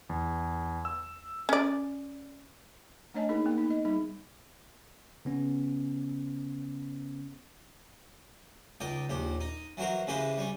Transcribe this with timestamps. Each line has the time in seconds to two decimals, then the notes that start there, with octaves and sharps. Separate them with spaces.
0.09 E2
0.85 E6
1.49 C#4 D5
3.14 A3 D4 C#5 D#5 G#5 A5
3.29 A#3 D#4 G#4 A#4
3.46 A#3 B3
3.58 D#4
3.70 D#5
3.85 G3 D#4 G#4
5.25 C#3 B3 C#4
8.80 C#2 D#4 D5 G5
9.10 A#1 D#2 G4
9.41 D#4
9.77 E3 F#3 F#4 A#4 C5
10.07 C#3 E3 G#3 G4 B4 C5
10.38 G3 C#4